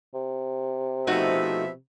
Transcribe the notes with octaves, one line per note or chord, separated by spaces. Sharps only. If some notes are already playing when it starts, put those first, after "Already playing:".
C3
B2 F3 A3 D#4 F#4 E5